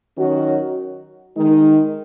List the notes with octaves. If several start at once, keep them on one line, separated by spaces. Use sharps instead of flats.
D#3 F#3 C#4 F#4
D#3 G#3 D#4